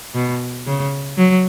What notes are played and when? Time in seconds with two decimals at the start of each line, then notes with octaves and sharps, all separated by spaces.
0.15 B2
0.67 C#3
1.18 F#3